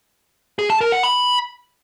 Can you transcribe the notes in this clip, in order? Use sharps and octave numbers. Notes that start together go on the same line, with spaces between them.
G#4
A5
A#4
F#5
B5